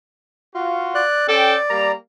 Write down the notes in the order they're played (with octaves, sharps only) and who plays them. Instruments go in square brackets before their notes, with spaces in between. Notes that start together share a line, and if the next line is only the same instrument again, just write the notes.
[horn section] F4 F#4
[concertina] D5 F#6
[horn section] C#4 A4 G5 [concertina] D5
[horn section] G3 A#3 A#5